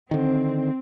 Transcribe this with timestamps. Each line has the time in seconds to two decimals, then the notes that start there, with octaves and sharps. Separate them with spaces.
0.11 D3 D#3 C4